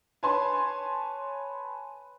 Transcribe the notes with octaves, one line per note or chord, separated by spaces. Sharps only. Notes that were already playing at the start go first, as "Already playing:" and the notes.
B4 C#5 G#5 A5 C6